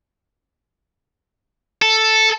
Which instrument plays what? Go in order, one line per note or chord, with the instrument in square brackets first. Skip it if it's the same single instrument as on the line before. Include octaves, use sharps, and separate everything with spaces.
[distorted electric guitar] A4